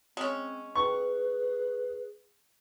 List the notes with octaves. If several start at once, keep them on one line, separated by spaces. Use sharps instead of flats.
G#3 C4 C#4
G#4 B4 C#6